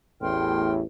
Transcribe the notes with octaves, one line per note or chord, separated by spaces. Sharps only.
A1 E2 A2 G5 C6 F6